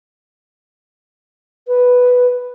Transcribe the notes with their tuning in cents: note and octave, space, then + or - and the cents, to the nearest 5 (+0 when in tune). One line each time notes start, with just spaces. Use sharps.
B4 +0